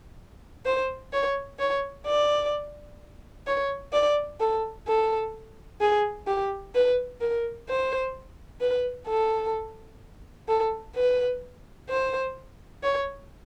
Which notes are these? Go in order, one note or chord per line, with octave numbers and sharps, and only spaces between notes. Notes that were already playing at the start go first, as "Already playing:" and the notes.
C5
C#5
C#5
D5
C#5
D5
A4
A4
G#4
G4
B4
A#4
C5
B4
A4
A4
B4
C5
C#5